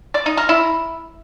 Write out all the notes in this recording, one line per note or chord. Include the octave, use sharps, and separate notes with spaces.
D5
D#4
A#4
E4